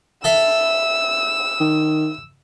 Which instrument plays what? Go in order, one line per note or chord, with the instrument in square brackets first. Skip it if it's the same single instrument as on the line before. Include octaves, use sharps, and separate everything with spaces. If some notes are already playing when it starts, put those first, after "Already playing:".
[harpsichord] A4 E5 F5 [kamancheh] E6
[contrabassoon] D#3